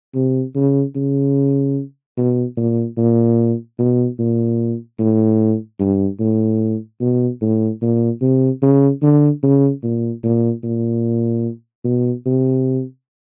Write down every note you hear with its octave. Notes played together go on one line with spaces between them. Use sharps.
C3
C#3
C#3
B2
A#2
A#2
B2
A#2
A2
G2
A2
B2
A2
A#2
C3
C#3
D3
C#3
A#2
A#2
A#2
B2
C3